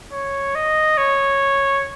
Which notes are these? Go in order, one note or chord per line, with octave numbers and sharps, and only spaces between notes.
C#5
D#5
C#5